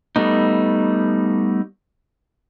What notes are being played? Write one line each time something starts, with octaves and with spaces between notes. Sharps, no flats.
G3 A3 B3 D#4